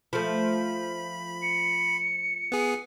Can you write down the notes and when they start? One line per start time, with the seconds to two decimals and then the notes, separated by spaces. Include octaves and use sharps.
0.13 F3 A3 B5
1.42 C#7
2.52 B3 G#4